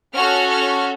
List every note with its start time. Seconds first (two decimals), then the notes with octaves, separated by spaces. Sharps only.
0.14 C#4 F#4 A4 F6
0.50 F6